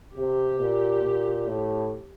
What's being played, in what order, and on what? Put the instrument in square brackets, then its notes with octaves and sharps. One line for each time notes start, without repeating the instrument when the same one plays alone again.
[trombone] C3 [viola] G4
[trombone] A#2
A#2
A2